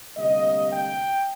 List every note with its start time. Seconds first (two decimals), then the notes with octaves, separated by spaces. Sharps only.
0.17 D2 C3 G3 A#3 D#5
0.72 G5